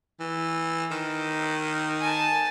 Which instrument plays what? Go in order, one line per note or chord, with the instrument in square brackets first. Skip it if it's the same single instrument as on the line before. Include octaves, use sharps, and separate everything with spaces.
[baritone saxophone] E3
D#3
[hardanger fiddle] G#5 A5